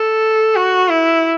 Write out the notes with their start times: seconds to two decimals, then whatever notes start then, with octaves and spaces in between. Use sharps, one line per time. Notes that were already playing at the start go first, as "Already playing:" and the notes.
Already playing: A4
0.55 F#4
0.90 E4